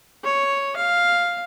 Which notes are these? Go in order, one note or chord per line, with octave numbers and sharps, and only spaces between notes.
C#5
F5